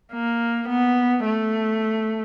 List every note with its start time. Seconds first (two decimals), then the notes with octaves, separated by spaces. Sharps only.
0.12 A#3
0.69 B3
1.26 A3